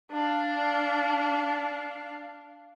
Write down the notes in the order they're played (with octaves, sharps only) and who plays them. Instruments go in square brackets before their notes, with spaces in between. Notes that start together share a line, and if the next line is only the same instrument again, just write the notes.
[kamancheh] D4 F5